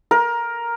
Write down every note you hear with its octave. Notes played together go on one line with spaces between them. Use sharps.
A#4